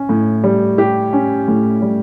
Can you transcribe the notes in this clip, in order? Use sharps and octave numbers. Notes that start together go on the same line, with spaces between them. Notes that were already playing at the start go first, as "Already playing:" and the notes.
Already playing: C#4
A2
G3
G4
C#4
A2
G3